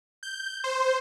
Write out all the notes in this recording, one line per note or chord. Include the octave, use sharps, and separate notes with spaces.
G6
C5